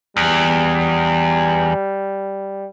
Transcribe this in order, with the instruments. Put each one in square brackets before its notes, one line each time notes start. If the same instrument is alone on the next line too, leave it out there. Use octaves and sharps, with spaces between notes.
[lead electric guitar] E2 [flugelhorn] G3